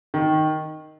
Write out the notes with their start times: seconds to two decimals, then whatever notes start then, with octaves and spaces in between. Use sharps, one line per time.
0.14 D#3